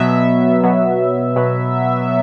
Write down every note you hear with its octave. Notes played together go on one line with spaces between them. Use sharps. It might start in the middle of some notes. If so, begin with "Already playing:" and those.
Already playing: B2 F#3 B3 E5
B2 F#3 B3
B2 F#3 B3